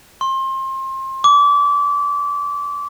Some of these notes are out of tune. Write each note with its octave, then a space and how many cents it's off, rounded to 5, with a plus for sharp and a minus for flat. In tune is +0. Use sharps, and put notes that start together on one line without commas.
C6 +30
D6 -30